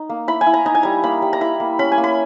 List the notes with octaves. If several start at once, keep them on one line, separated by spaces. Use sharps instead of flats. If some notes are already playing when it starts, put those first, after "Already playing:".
Already playing: D#4
A#3
E4 B5
G#5
E4
A#5
D#4 A#5
G#5
G3 A#5
A#3 B5
G3
A#5
E4 B5
A#3
C#4 B5
G#5
A#3
B5